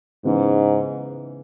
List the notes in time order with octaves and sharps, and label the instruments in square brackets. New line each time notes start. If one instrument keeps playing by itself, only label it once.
[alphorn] G#2 [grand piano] C#3 E3 B3